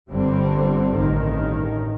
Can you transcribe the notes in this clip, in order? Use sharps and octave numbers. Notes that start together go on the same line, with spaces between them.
G1 G2 D3 G3 C4
A1 G2 D#3